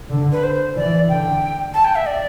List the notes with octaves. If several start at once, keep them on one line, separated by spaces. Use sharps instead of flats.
D3
B4
C5
E3 D5
D3 G5
A5
G5
E5
D5